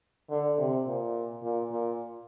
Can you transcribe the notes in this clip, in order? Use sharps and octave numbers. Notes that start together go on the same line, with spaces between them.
D3
C3
A#2
A#2
A#2